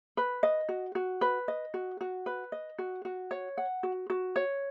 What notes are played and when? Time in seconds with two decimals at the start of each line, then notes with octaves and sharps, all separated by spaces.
0.17 B4
0.43 D#5
0.69 F#4
0.95 F#4
1.21 B4
1.48 D#5
1.74 F#4
2.01 F#4
2.26 B4
2.52 D#5
2.78 F#4
3.05 F#4
3.31 C#5
3.57 F#5
3.83 F#4
4.10 F#4
4.36 C#5